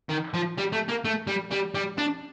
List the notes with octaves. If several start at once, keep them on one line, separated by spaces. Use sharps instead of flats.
D#3
F3
G3
A3
A#3
A3
G3
G3
G3
D4